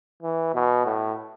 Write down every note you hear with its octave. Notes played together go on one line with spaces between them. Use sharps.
E3
B2
A2